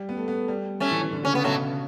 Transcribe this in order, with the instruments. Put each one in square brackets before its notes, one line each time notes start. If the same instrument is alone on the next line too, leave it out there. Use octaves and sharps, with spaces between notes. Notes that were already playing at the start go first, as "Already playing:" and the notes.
Already playing: [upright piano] G3
B3
A3
B3
G3
[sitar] A3 C#4
[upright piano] E3
E3
D3
[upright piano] C#3 [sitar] C#4
[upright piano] C#3 [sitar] B3
[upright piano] B2 [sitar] F#3 A3